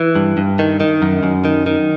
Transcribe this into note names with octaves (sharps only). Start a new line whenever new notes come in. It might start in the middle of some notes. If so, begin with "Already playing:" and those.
Already playing: E3
G2
G2
D#3
D#3
F#2
F#2
D#3
D#3